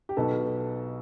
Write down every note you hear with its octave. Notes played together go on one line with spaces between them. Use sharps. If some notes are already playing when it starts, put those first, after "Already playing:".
G4
B1 B2 B3 A4